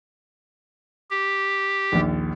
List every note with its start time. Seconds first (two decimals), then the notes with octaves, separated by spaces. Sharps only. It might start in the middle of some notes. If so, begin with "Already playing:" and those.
1.10 G4
1.92 A#1 D#2